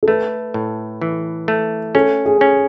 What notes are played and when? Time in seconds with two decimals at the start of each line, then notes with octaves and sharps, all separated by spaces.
0.03 A4
0.08 A3 B4
0.54 A2
1.01 E3
1.48 A3
1.95 C#4 A4
2.25 G#4
2.41 C#4